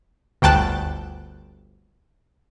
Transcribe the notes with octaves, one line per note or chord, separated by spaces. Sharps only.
G1 D2 G5 A5 F#6